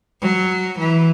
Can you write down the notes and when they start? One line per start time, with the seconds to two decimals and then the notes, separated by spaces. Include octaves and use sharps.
0.21 F#3
0.78 E3